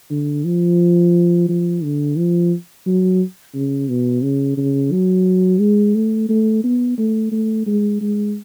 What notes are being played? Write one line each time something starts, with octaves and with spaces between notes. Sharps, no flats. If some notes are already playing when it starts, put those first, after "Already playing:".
D3
F3
F3
D3
F3
F#3
C#3
B2
C#3
C#3
F#3
G#3
A3
A3
B3
A3
A3
G#3
G#3